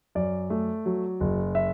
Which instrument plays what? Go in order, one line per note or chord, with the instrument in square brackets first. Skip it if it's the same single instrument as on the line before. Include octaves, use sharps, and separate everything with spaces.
[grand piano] F#2 D5
A3
F#3
F#1
E5